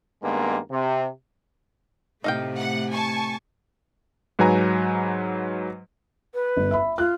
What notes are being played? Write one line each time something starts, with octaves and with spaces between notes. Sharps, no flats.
G2 D#3 G#3 A#3 B3
C3
A2 C3 A3 D#4 F5 G5
F#5
G#5 A5 C#6
G#2 F#3 B4 G#5 A#5
B4
G1
E5 B5
F4 F#6